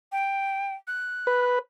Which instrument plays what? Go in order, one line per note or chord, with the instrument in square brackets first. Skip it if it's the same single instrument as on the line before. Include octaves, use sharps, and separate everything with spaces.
[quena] G5
F#6
[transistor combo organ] B4